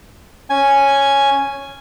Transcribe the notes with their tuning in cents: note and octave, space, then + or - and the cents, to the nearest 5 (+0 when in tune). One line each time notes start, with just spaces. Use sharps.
C#4 +0 G#5 +0